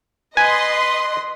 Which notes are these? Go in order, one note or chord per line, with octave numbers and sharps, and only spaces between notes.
B4 D#5 G#5 C6